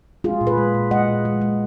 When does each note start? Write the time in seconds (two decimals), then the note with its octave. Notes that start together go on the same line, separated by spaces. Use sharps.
0.24 G#3 F4 G#4
0.41 A#2
0.47 G#4 B4
0.57 G#3
0.74 A#2
0.91 G#3 D#5 F#5
1.08 A#2
1.25 G#3
1.41 G#3